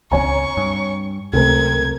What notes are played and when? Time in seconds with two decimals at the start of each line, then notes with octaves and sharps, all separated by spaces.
0.11 C#2 C4 D4 C#5 G#5 A#5 C#6
0.57 G2
1.33 C#2 F#2 C3 A3 C4 A#4 G#6